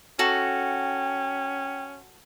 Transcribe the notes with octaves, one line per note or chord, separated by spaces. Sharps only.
C#4 F#4 A4 G5